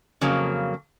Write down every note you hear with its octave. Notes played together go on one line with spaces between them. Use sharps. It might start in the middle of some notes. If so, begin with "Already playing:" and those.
F2 C#3 F#3 A#3